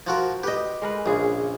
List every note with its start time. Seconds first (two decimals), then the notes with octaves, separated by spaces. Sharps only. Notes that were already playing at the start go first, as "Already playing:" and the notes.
0.07 F3 F#4 A#4
0.43 G4 B4 D#5 G5
0.82 G#3 A#4 B4
1.06 A#1 C#3 G#4